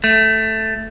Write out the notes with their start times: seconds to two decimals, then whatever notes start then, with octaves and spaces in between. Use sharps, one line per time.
0.04 A3